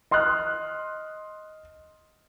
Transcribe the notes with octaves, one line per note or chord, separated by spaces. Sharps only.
D#5 C6 D#6 F6 F#6